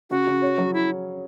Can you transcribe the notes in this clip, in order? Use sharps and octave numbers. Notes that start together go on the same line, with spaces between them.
C#3 F#4
C#3
C#5
F#3
E4